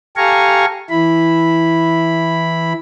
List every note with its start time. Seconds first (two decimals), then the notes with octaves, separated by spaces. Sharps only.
0.17 G4 A4 F5 G#5 A#5 C#6
0.90 E3 E4 B5